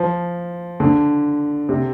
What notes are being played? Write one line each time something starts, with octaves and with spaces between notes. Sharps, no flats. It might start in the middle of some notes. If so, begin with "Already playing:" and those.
Already playing: F3
D3
C3